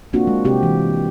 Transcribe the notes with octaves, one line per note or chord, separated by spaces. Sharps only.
A#3 C4 D4 F4 F#4
G#3
C3 C4 G4
E3